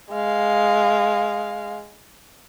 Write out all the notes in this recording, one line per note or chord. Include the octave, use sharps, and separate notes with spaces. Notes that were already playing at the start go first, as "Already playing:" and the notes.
G#3 F5